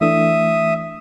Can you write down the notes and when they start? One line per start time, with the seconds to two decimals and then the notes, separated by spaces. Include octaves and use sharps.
0.01 E3 A3 D4 E5 D#6